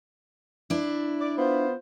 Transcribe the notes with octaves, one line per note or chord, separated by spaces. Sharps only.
D4 E4
D5
B3 F4 C5